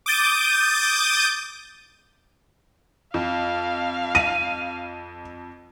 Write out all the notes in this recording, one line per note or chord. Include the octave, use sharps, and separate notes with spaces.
D6 D#6 G6 A6 D#7
F2 F5
D#7